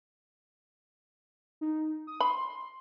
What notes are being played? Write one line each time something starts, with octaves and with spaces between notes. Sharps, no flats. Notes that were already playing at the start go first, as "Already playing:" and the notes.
D#4
D#6
B5 C6